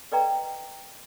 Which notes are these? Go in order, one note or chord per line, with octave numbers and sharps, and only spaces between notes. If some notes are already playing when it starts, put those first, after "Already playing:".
A4 B4 D5 D#5 G5 A#5